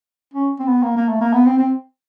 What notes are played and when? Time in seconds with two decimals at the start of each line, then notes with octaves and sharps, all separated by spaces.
0.34 C#4
0.59 C4
0.67 B3
0.83 A#3
0.97 A#3
1.09 A3
1.21 A#3
1.33 B3
1.46 C4
1.59 C4